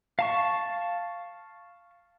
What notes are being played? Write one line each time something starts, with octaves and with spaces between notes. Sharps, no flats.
F5 A5 C#6